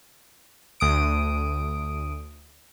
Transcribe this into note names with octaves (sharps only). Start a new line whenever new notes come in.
D2 D#6 D7